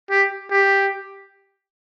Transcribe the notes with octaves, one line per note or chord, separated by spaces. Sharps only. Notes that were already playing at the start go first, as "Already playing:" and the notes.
G4
G4